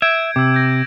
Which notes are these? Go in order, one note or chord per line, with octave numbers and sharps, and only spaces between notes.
E5 G6 G#6 D7
C3 D6 E6
G6 A#6